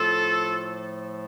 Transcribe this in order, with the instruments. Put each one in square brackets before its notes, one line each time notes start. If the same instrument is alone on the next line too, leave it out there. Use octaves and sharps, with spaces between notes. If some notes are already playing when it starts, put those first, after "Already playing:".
Already playing: [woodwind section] A2 F3 A3 F4 A4